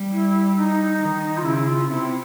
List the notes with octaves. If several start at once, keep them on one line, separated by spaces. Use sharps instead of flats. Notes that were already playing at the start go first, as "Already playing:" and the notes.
Already playing: G3
E4
D#4
D#3
F4
C#3 E4
F4
C3 E4